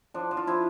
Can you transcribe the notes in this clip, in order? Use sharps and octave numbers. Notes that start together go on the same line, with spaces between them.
F3 D4
F3
F4
F3 E4